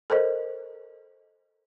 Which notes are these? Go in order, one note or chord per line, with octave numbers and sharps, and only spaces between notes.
A4 A#4 C5 D#5